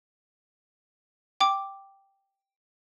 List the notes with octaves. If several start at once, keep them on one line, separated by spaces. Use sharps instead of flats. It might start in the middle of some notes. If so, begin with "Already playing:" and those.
G5 D6